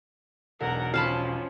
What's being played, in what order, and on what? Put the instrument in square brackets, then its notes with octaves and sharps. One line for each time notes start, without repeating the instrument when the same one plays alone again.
[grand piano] E1 B1 [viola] A#4 F#5
[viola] F3 C#4 [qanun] F5 A5 B5